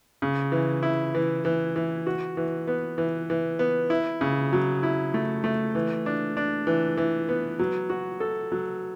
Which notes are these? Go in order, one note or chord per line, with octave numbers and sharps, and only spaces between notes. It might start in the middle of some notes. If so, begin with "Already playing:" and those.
C#3
E3
E4
E3
E3
E3
F#4
E3
B3
E3
E3
B3
E4
C#3
F#3
E4
A3
A3
E3
D4
D4
E3
E3
B3
F#3
F#4
A4
F#3